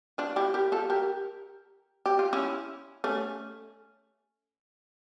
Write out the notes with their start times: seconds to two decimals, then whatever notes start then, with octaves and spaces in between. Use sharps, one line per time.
0.18 D4 F4
0.36 E4 G4
0.54 G4 A#4
0.72 F4 A4
0.90 G4 A#4
2.06 G4
2.19 F4
2.33 C#4 E4
3.04 A3 C#4